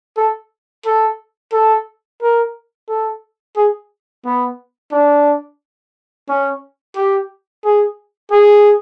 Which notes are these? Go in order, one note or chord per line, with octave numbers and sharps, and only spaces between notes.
A4
A4
A4
A#4
A4
G#4
B3
D4
C#4
G4
G#4
G#4